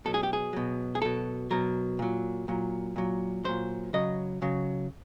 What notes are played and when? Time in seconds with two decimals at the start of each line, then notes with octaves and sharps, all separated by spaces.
0.05 B2 F#3 A4
0.14 G#4
0.23 G4
0.33 G#4
0.53 B2 F#3
0.95 G#4
1.02 B2 F#3 A4
1.51 B2 F#3 A#4
1.99 A#2 F#3
2.48 A#2 F#3
2.96 A#2 F#3
3.44 A#2 F#3 C5
3.93 C#3 F#3 D#5
4.42 C#3 F#3